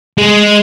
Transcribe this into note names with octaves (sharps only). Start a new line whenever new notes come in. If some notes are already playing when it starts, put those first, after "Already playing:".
G#3